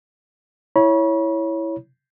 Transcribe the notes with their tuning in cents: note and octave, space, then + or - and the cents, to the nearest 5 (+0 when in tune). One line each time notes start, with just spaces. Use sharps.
E4 +0 C#5 +0 B5 -40